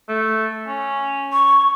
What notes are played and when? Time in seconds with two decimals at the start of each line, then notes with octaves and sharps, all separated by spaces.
0.09 A3
0.67 C#4
1.33 C#6